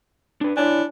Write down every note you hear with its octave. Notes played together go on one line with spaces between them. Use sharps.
D4 B4
D4 E4 C#5 G#5